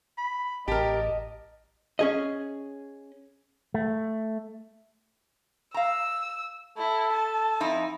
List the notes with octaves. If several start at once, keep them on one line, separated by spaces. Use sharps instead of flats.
B5
A1 G4 A#4 D#5 A5
C#4 G#4 D#5
A3
F5 A#5 E6
E4 A4
A5
F2 D#4 E4